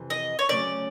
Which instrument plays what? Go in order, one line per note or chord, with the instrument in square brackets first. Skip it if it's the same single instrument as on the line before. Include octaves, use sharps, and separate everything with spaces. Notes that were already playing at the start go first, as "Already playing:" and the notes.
Already playing: [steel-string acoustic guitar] F2 C3 E3
[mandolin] D#5
C#5
[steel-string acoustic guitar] D2 C#3 F#3 A3 C#4 [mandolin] D5